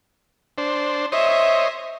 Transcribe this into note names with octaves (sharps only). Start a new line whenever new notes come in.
D4 C5
C5 C#5 D#5 E5